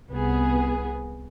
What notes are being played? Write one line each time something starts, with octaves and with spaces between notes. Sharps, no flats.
C2 B3 G#4